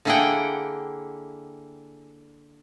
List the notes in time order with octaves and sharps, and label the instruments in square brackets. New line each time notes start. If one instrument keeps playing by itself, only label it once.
[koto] D3 A#3 E4 G#4 F#5 G5